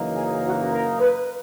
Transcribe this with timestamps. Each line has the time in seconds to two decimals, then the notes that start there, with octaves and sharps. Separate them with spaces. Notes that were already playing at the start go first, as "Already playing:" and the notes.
Already playing: F#1 F#2 E3 A#3 D#4
0.15 G#4
0.44 F#4
0.73 A#4
1.00 B4